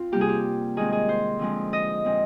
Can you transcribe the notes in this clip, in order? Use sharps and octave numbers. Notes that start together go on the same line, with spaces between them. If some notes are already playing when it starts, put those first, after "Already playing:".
Already playing: C4 F4
C3 G3 A#3 G4
G#4
G4
D#3 G#3 C4 G#4
G#4
C5
D3 F3 G#3 C4
D#5
A#2 G#3 C4